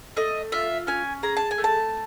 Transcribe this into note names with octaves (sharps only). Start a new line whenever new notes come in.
A3 D#5
F4 E5
C#4 G#5
G#4 A#5
A5
G#5
A3
A5